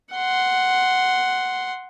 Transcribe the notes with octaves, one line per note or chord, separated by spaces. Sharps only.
F#5 C6